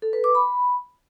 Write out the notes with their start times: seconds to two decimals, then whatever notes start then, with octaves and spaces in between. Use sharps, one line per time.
0.02 A4
0.13 B4
0.24 D6
0.35 B5